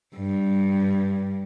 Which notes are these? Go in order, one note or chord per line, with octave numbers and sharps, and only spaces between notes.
G2